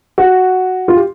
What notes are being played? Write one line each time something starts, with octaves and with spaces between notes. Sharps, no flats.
F#4
F4
G4